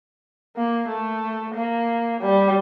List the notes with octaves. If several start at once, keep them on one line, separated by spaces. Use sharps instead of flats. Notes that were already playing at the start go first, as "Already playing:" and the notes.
A#3
A3
A#3
G3